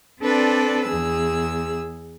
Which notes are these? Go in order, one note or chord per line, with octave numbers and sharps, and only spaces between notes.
C4 D4 A4 B4 D5
E2 G#4 E6